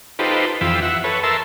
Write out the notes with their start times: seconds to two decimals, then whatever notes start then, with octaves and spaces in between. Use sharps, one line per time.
0.19 D#4 F4 G4 A4 B4 C5
0.61 F2 E3 F4 G5 B5 E6
0.82 E5 F#5
1.04 A4 B4 C#5
1.23 A4 A#4 E5 A5 C6 E6